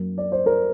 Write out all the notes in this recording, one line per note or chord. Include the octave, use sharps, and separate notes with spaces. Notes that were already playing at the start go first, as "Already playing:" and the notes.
Already playing: F#2 F#3 A#3
D5
C5
A#4